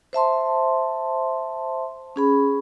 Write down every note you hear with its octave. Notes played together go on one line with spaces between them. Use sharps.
C5 E5 A5 C6
C#4 G#4 B5